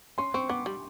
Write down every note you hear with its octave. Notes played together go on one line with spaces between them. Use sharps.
C#4 C6
C4 C#6
B3 D6
G3